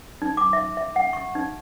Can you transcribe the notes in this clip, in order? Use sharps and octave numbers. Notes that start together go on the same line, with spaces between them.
D#4
D6
E5
E5
F#5
C#6
D#4